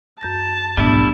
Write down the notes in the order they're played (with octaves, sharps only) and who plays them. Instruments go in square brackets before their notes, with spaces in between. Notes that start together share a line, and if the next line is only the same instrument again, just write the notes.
[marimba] F#2 G6 A#6 [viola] A5
[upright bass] B1 G#2 [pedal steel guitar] G3 A3 E4 [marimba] B3 D4